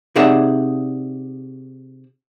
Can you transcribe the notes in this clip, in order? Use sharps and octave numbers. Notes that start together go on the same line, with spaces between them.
C3 D#4 G#4 D5 E5 F#5